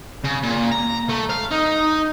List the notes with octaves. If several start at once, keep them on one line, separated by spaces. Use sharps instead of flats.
C#3
A#2
A#5
A3
F5
D#4